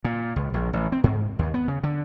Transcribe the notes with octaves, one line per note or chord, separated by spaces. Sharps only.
A#2
C#2
A#1
A1
C4
G#2
D#2
B3
C#3
D3